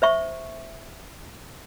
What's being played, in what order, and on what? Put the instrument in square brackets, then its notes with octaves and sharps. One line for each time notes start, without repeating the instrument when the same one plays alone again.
[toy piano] C5 E5 C#6